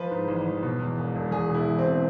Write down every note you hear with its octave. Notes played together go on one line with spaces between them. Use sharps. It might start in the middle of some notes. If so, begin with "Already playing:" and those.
Already playing: F3 B4
G#2
A1
A1
B2
E2
E1
E1
E2 G#4
B2
E4
E2
C4
B2